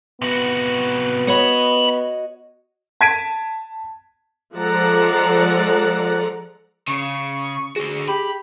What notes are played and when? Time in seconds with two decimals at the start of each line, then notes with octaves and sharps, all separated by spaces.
0.22 C3 B3 F#4
1.27 F#4 C#5 D#5 F#5 B5
3.01 A5 G#6 B6 D7 D#7
4.55 F3 G#3 A4 D5 F#5 A#5
6.88 C#3 C#6
7.76 D3 F#4 G#4
8.08 G4 B5